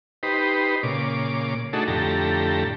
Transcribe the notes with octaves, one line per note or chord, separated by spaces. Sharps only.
D#4 G4 B4 C5
A#2 C#3 D6
A3 D4 D#4 F#4 G#4 A4
F2 A2 D3 G4 A4 A#5